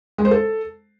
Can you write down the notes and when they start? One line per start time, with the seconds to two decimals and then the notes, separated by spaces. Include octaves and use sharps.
0.18 G#3
0.25 C5
0.31 A4